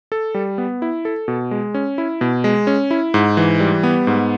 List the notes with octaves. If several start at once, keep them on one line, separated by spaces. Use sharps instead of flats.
A4
G3
B3
E4
A4
B2
G#3
C#4
E4
B2
G#3
C#4
E4
G#2
E3
G3
B3
G#2